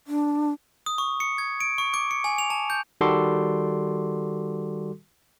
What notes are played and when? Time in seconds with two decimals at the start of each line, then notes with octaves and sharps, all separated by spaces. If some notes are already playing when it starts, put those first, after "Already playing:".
0.07 D4
0.86 D#6
0.98 C#6
1.20 C#7
1.38 G#6
1.60 D7
1.78 C#6
1.94 D6
2.11 C#7
2.24 G#5
2.38 F7
2.50 A5
2.70 G6
3.01 D#3 G3 F#4 A4 C6 D6